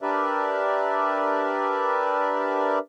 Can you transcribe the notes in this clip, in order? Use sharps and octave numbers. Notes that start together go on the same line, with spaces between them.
D4 G4 A#4 B4 D5 E5